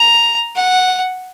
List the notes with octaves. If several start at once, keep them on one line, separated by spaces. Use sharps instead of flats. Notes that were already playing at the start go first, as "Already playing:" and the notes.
Already playing: A#5
F#5